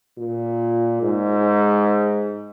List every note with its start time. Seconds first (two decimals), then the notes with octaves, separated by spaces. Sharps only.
0.19 A#2
1.03 G#2